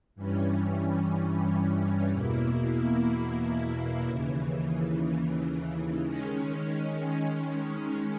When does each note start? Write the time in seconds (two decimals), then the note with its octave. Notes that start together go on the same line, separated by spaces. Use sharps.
0.15 G2 E3 G3 C#4
2.10 E2 B2 A#3 E4
4.06 D#2 C#3 E3
6.02 D#3 G#3 C#4